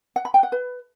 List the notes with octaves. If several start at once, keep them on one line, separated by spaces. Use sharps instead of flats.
F#5
B5
G5
F#5
B4